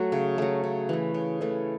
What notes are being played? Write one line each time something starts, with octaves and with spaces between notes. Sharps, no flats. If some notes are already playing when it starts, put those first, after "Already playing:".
Already playing: F#3 A3 F#4
C#3
F#3 A3
C#3
E3 A3
C#3
E3 A3